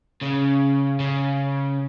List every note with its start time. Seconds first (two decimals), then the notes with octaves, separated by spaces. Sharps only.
0.22 C#3
1.00 C#3